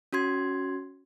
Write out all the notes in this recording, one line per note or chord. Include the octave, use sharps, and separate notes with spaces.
C#4 F#4 C6 G#6